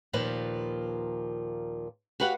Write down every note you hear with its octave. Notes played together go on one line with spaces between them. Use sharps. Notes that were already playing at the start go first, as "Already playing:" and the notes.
D#2 A#2 F3 B4
F#4 G4 B4 F5 F#5